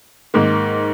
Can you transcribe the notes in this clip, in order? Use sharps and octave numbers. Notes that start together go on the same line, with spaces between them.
G#2 D#3 A#3